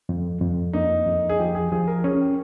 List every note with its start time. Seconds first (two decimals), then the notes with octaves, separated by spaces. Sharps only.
0.09 F2
0.41 F2
0.73 A#3 D#4
1.07 F2
1.29 G#4
1.39 F3 G4
1.55 G#4
1.72 F3 G#4
1.88 A#4
2.04 C#4 G#4
2.21 G4